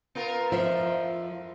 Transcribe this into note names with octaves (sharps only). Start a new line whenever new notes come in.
B3 F4 A#4
F2 F3 E5